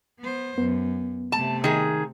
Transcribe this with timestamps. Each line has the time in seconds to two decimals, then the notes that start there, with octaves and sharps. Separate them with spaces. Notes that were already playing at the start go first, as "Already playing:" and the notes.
0.19 B3 C5
0.58 F#2 B3
1.32 C3 A3 A5
1.64 D#3 G#4